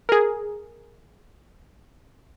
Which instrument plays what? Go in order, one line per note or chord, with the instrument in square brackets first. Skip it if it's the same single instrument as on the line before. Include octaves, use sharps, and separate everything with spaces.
[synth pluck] G#4 A#4